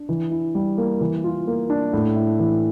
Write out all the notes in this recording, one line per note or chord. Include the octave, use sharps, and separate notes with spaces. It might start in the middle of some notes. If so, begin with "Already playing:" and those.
Already playing: D4
E3
E4
G3
A#3
E3
F4
A#3
D4
A2
E4
E3